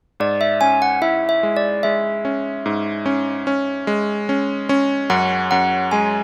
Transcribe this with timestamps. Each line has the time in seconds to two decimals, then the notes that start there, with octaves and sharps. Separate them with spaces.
0.20 G#2 D5
0.41 E5
0.61 C#4 G#5
0.82 F#5
1.02 E4 E5
1.29 E5
1.43 G#3
1.56 D5
1.83 G#3 E5
2.25 C#4
2.66 G#2
3.06 C#4
3.47 C#4
3.87 G#3
4.29 C#4
4.69 C#4
5.10 F#2 F#5
5.51 F#2 F#5
5.91 G#3 G#5